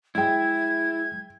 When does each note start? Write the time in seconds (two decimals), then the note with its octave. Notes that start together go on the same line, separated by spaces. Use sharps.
0.15 F#3 G#3 E4 G#4 E5 G5 G#6